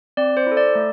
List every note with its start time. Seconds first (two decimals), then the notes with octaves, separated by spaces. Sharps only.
0.17 C4 D5
0.37 C5
0.47 E4 A4
0.57 D5
0.75 A3